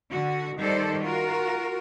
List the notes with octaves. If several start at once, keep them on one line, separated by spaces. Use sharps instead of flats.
D3 F#4
D#3 G3 A4 C5 D5
F4 F#4 A#4